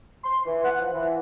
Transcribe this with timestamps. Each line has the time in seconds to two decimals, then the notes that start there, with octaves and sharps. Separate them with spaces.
0.24 C6
0.46 E3
0.64 F#5
0.80 F3
0.93 E3